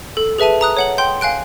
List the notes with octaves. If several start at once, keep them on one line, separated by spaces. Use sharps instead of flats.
A4
G#4 B4 E5 A5 D#7
A#5 D#6 F#6
C#5 F#5 F#7
G5 C6 G6
F5 G#5 F#6 D7